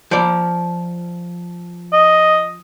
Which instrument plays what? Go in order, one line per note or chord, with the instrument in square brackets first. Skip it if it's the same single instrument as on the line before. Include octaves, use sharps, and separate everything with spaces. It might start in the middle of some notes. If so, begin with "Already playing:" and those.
[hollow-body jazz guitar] F3 D5
[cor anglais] D#5